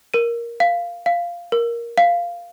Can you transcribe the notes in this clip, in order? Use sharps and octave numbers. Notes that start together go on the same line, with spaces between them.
A#4 D#7
F5
F5
A#4
F5